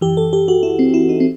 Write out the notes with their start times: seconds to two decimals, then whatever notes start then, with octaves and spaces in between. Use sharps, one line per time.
0.01 F#2 E3 G4
0.17 A4
0.33 G4
0.48 F#4
0.63 E4
0.79 C4
0.94 E4
1.09 D#4
1.20 C4